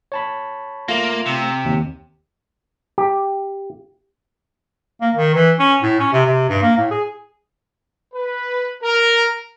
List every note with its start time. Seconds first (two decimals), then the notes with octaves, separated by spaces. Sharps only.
0.12 C#5 A5 B5
0.88 A3 A#3 F4 A#6
1.26 C3
1.65 D#2
2.98 G4
5.01 A#3
5.15 D#3
5.35 E3
5.60 C#4
5.82 A2
6.00 C#4
6.13 C3
6.25 C3
6.50 G2
6.62 A#3
6.77 A2
6.91 G#4
8.13 B4
8.82 A#4